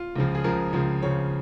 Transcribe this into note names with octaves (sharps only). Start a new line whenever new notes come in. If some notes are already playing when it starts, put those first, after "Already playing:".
Already playing: F4
C#2 C#3 F3
G#4
C#2 C#3 F3 A#4
C#2 C#3 F3
C#2 C#3 F3 C#5